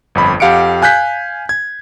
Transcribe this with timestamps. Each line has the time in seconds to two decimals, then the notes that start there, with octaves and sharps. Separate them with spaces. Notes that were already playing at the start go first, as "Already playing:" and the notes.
0.15 G1 F2 B5
0.40 F2 G4 F5 F#5 C#7 D7
0.82 F5 G#5 F#6 G6 B6
1.49 G#6